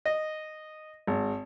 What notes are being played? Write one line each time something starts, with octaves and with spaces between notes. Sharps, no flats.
D#5
G#1